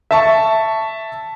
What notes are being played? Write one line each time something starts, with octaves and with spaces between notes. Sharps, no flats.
E5 A5 C#6